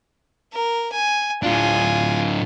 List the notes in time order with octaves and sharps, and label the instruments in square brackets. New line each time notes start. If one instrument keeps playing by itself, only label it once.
[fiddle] A#4
G#5
[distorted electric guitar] A2 D4 [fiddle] F4 G#5